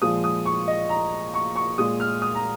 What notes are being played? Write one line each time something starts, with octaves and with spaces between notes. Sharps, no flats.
A#2 F3 G#3 D#6
D#6
C#6
D#5
A#5
C#6
C#6
A#2 G#3 D#6
F6
D#6
A#5